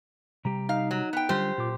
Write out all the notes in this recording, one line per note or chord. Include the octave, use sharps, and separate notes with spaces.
C3 G3 G4 A#5
D#4 F5
F#3
B3 G5
F#2 D3 G3 F4 G4 C5
A#2 F4 D6